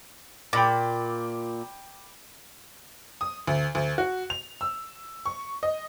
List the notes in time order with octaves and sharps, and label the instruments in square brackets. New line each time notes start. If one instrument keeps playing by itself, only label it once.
[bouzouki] A#2 [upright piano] G5 B5 D6
[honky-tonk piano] D#6
D2
D2
F#4
F7
E6
C#6
D#5